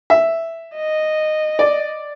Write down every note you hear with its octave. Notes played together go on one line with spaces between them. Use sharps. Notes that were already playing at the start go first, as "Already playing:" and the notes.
E5
D#5
D5